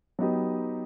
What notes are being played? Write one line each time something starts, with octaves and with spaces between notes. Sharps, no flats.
F#3 B3 D#4 G4